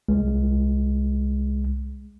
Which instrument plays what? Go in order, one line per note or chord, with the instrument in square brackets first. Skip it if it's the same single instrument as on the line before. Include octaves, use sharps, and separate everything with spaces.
[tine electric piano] C2 G#3